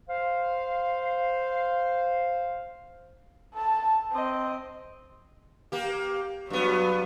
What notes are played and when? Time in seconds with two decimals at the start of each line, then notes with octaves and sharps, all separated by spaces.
0.08 C5 F5
3.54 A4 A5
4.12 C4 D#5
5.72 A#3 G4
6.50 G2 F#3 B3